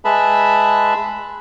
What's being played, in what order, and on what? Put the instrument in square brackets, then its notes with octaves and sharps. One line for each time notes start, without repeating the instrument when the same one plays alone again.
[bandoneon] G#3 G#4 B4 E5 A5 B5